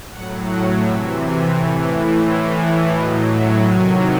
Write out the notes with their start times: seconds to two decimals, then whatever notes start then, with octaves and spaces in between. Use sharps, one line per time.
0.11 A2 F#3 F#5
0.47 F#5
0.82 C3 E3 E5
1.18 G#5
1.53 A2 E3 C#5
2.25 A2 E3 C5
2.60 C#5
2.95 A2 F#3 D#5
3.31 E5
3.66 C3 D#3 F#3 G#5